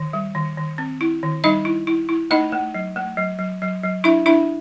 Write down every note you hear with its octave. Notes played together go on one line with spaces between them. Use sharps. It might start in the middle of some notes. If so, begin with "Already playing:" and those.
Already playing: D#3
G3
D#3
D#3
C4
E4
D#3
G3 D#4 D#5
E4
E4
E4
A3 D#4 D#5
A3
F#3
A3
F#3
F#3
F#3
F#3
D4 E4 E5
D4 E4 E5